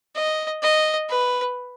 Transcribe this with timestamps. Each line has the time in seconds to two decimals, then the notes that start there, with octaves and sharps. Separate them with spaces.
0.15 D#5
0.62 D#5
1.09 B4